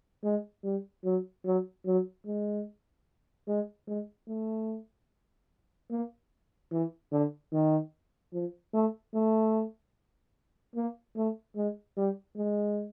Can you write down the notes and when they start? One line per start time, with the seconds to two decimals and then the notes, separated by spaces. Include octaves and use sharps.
0.24 G#3
0.64 G3
1.04 F#3
1.45 F#3
1.86 F#3
2.26 G#3
3.48 G#3
3.88 G#3
4.28 A3
5.90 A#3
6.72 E3
7.12 D3
7.53 D#3
8.33 F3
8.73 A3
9.14 A3
10.75 A#3
11.16 A3
11.56 G#3
11.97 G3
12.37 G#3